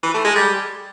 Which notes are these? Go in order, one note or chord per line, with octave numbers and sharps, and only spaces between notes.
E3
A3
G#3
G3